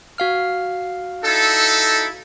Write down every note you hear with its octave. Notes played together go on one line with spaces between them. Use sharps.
F#4 F5 F6
D#4 E4 A4